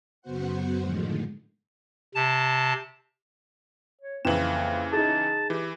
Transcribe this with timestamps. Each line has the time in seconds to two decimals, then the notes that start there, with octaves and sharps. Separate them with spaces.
0.22 F#2 C#3 B3 F#4 C5 F#5
0.82 A2 D3 D#3 F3 G#3
2.15 C3 A5
4.02 C#5
4.25 F2 C#3 E3 A#3 B4 E7 F#7
4.93 D#4 G#4 A5
5.50 E3 G4